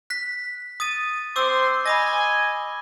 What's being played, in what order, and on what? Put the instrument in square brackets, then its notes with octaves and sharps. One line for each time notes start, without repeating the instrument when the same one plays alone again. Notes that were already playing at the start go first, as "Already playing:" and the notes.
[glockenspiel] F#6 B6
D#6 A6 D#7
[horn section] C4 C5 C6 [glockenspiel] D6 E6
[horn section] D#5 G#5 [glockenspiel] B5 D#6 A#6